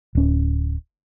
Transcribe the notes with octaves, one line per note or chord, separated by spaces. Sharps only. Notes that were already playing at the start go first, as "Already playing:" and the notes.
D1 C#4